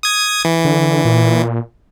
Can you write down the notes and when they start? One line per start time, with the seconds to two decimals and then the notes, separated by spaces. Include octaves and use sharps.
0.03 D#6 G#6
0.45 E3
0.65 D3
1.05 A#2